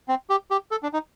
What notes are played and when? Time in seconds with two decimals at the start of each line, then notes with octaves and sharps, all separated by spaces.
0.08 C4
0.30 G4
0.51 G4
0.71 A4
0.83 D4
0.93 D#4